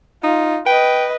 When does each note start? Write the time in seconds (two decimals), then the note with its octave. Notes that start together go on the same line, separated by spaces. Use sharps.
0.24 D#4 F4
0.66 B4 D#5 G5